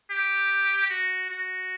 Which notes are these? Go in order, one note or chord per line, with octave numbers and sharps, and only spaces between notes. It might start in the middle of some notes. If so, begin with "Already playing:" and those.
G4
F#4
F#4